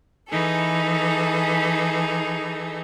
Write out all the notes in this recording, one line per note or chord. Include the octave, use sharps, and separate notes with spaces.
E3 D#4 G#4 A4